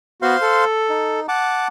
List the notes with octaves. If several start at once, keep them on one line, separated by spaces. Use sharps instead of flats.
B3 F#4 C5 F5 C6
A4
D#4
F#5 A5 D6